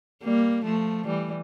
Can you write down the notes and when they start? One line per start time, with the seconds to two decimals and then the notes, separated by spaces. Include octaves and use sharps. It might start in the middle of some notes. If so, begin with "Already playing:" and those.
0.23 G3 A#3
0.65 F3 A3
1.07 E3 G3